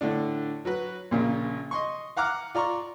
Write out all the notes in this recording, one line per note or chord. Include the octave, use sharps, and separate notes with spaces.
A2 D3 A3 D4
F#3 F#4 B4
A#1 A#2 C#3
D#5 C6 C#6
F5 F#5 A#5 D6 F6
F4 D5 A#5 C6 C#6